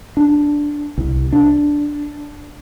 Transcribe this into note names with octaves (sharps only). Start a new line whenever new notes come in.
D4
C2
D4